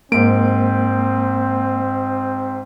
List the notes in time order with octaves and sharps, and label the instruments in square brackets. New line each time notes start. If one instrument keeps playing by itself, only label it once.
[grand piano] G#2 D7 [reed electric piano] A#3 [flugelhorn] C4